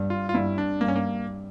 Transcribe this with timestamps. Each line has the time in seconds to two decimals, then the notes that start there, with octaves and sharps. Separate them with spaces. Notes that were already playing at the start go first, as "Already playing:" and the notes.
Already playing: G2
0.10 F4
0.29 F4
0.34 G2 E4
0.58 D4
0.81 G2 A#3
0.88 C#4
0.96 A#3